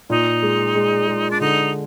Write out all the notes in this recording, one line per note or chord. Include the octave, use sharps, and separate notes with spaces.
A#2 D#4
G#3
G#3
G#3
D4
D3 D#4